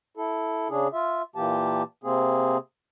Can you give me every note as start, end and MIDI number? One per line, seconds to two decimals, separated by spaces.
0.17 0.68 64
0.17 0.68 69
0.69 0.88 49
0.69 0.88 62
0.69 0.88 68
0.93 1.22 65
0.93 1.22 76
1.36 1.83 46
1.36 1.83 52
1.36 1.83 58
1.36 1.83 67
1.36 1.83 81
2.04 2.57 48
2.04 2.57 58
2.04 2.57 60
2.04 2.57 68